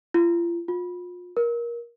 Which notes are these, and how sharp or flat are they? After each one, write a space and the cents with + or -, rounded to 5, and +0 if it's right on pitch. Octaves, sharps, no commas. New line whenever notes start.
F4 -40
F4 +35
A#4 +20